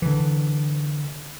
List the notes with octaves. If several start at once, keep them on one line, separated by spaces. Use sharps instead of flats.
D3 E3